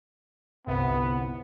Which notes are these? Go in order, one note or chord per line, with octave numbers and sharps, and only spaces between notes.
G1 C2 B3